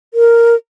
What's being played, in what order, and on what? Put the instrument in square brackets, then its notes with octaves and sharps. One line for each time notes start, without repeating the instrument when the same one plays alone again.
[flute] A#4